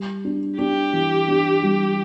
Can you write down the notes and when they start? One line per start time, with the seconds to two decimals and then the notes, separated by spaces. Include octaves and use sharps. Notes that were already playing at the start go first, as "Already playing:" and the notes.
Already playing: G3
0.25 D4
0.59 D4 G4
0.93 E3
1.28 D4
1.63 G3